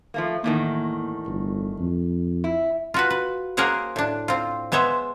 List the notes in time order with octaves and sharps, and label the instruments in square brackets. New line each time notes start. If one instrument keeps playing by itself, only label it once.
[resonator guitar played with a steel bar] F3 A3 A#3
[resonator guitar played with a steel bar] E2 A2 D#3 [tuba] A#3
[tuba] G1
F2
[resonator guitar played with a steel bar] E4
[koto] F4 F#4 B4
B4
A#3 G#4 A#4 C5 C#5 F#5
A2 D4
C4 F4
G#3 B3 C5 C#5 E5